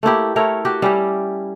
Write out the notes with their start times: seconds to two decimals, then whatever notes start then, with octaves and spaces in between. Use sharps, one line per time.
0.03 A3 A#3 E4 G4
0.36 A3 E4 A#4 C#5
0.65 F#4 G4
0.82 G3 C#4 E4 G4